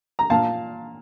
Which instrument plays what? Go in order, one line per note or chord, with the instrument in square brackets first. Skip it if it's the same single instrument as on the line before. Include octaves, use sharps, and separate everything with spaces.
[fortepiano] A#5
A#2 F5 A5